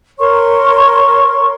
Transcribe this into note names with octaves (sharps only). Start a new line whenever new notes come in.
A#4 C#5 C6 C#6